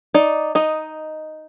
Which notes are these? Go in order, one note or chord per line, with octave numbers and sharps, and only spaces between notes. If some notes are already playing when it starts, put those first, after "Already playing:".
D#4 D5
D#4 D#5